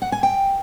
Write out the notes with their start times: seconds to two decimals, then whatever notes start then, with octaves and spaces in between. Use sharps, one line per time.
0.02 F#5
0.12 G#5
0.23 G5